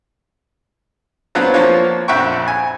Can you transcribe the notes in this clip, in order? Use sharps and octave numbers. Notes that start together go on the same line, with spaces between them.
F#3 B3 C4 D4 F4 F#4
F3 A#3 D4 F4 C#5
A#1 F2 E5 F#5 G5 C#6
G#5